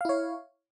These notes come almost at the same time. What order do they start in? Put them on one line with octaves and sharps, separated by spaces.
F5 E4 C#5